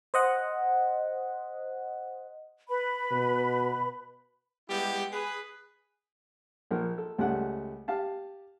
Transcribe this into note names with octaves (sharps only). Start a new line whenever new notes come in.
C5 D#5 F#5
B4 B5
B2
G3 G#3 B3 E4 G4
G#4 B4
A#1 F3 A#4
A4
C#2 G3 A3 A4 F#5
G4 F5 A5